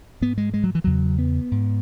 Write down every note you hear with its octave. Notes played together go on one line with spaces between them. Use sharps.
G#2 B3
G#3
G#3
F#3
E3
E2 C#3 F#3
B3
G#2